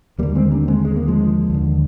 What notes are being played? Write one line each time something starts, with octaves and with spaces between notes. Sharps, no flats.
D#2 D3 G3 A#3
G#3 C4
A#3 D4
G#3 C4
G#3
A#3
F3 G#3
D#2 D3